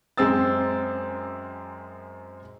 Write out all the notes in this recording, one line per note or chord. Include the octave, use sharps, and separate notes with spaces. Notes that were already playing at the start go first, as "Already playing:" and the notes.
F#2 G#3 C4 E6 A6